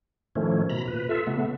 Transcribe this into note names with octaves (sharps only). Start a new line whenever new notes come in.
A2 D#3 F3 A3 C#4
B2 A#5 B5
A#2 B4
F4 A4 E5
C#3 A3 B3